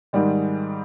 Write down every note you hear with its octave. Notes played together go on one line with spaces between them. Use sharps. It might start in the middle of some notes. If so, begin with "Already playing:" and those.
G#2 D#3 G3 G#3